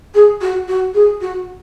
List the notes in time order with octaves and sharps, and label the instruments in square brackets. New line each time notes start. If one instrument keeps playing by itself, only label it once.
[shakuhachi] G#4
F#4
F#4
G#4
F#4